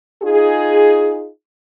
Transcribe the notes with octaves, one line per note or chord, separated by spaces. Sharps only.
D#4 F4 G#4